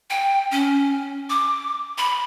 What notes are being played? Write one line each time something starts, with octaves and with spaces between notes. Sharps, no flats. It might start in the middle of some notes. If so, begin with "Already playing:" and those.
G5
C#4
D6
B5